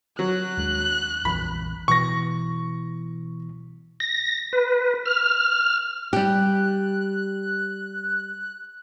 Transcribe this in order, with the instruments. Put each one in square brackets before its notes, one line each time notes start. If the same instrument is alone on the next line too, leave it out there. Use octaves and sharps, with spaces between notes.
[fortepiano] F#3 [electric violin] F#6
[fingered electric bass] D#2 G#3 D4
[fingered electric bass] A#1 F2 E3 [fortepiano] B5
[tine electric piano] B2 E3 [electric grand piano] C#6 A#6
[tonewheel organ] A#6
B4
F6
[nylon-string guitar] G3 G4 [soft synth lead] F#6